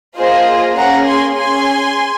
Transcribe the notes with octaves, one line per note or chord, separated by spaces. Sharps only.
A#3 F4 G#4 C5 D#5
A#3 C#4 G#4 F#5 A#5
G#5 C6
C#4 G#4 G#5 C6